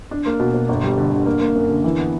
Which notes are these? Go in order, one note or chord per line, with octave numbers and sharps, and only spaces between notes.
D4
A#3
B2
B2
G1
G3
D3
D3
A#3
A#3
F#2
D3
E3
B3